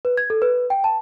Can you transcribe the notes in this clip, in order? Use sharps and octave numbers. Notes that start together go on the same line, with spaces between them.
B4
G#6
A4
B4
G5
A5